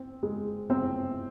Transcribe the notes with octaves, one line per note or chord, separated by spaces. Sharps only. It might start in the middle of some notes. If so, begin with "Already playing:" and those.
Already playing: C4
G#3
C4